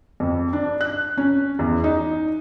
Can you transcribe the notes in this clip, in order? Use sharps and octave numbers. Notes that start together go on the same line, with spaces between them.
F2
D4
F#6
C#4
E2
D#4